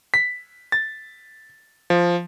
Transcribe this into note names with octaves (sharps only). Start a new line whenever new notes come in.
B6
A6
F3